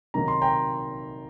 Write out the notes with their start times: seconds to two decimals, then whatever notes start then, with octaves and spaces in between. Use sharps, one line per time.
0.14 C3 D#3 F#3 A#3 D#4 A#5
0.28 C6
0.42 G5 A#5